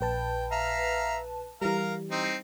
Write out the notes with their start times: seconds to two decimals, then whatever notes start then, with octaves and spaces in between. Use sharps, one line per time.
0.01 A#1 B4 G5 A5
0.52 E5 F5 A#5
1.62 E3 G3 A#4 F5 A#5
2.11 C4 D#4